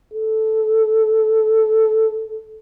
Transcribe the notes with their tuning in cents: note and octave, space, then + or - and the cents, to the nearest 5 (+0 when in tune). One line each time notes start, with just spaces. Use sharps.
A4 -5